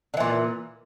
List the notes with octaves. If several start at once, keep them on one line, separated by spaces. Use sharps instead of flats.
A#2 D3 E3